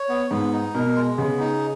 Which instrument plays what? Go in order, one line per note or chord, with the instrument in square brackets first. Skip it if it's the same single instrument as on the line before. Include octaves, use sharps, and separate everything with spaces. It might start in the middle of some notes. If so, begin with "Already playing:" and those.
Already playing: [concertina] C#5
B3
[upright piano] G#2 [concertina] B3
[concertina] D#4
[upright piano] B2 [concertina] A#4
[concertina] G#3
[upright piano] C#3 [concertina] B3
[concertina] D#4